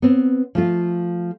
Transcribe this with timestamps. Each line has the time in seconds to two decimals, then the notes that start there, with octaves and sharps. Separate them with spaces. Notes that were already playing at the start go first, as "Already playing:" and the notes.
0.02 B3 C4
0.55 F3 A3 F4